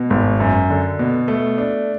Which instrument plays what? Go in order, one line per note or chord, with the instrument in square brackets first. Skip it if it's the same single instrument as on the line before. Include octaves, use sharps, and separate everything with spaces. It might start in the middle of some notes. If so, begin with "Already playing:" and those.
Already playing: [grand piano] B2
G#1
F#2
D3
B2
A3
D4